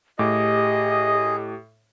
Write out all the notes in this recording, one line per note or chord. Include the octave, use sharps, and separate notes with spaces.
A2 G4 G#4 D#5 D6